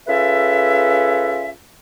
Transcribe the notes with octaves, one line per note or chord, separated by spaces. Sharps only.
C#4 F4 G#4 A4 B4 E5